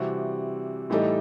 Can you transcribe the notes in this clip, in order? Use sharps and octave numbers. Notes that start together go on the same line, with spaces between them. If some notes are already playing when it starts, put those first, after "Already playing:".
Already playing: C3 E3 G3 C4 F#4
A2 E3 G3 D#4 A4